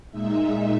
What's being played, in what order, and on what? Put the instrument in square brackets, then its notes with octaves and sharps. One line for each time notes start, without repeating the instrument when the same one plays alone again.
[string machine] A#2 G#3 D#4 E5